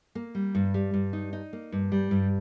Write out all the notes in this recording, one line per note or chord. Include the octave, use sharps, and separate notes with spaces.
A#3
G3
G2
G3
G2
D#4
D#4
A#3
G2
G3
G2